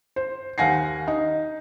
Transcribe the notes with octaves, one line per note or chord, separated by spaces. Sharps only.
C5
D#2 F5 F#5 G#5 A#6 C7
D#4